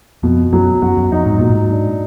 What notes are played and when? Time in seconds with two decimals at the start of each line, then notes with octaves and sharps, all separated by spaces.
0.23 F2 B2
0.53 F#2 F#3
0.82 F#2 F#4
0.97 F#2
1.12 F2 D#4
1.26 G#2
1.38 A#2 F#3
1.49 G#2
1.71 D4